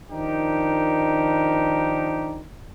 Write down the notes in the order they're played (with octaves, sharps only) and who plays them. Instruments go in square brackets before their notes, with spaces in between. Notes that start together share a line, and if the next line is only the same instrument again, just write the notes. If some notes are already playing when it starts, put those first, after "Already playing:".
[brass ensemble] D#3 F3 D4 D#4 G4 A#4